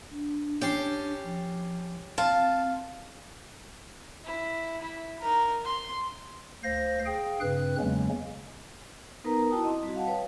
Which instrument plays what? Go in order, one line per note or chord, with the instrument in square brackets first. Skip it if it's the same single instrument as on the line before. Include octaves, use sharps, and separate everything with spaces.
[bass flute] D4
[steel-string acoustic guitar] C#4 G4 [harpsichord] G5 A5 C6
[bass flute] F3
[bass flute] C4 [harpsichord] F4 [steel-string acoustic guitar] A5
[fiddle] E4
E4
D#4 A#4
C6
[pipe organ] D2 C5 F5 A#6
G#4 F5 G5
G2 C#3 C4 B4 F#6
E2 C#3 F#3 G#3 A#3 C#4
[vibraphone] B3 D#4 A#4 B4 A#5
E4 F#4 G5 A5 D#6
C4 D#5
G3 F#4
F5 F#5 A5
B4 C#5 G5